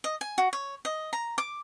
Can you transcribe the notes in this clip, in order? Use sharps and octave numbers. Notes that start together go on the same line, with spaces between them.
D#5
G#5
F#4
C#5
D#5
A#5
D6